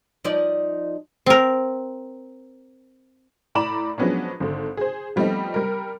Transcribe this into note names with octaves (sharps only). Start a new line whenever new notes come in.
F3 D#4 D5
C4 A#4
A2 D5 A#5 B5 E7 F#7
F3 F#3 G#3 B3 C#4 D4
G#1 D3
G#4 C5
F3 G3 A3 B3 C4 D#4
G3 A#4